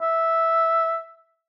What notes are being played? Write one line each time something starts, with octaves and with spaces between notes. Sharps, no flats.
E5